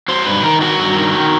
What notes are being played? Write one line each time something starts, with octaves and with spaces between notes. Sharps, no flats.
F#3 C5
G2 B4
D#3 A#4
F#3 F#4
G2
D#3
D#3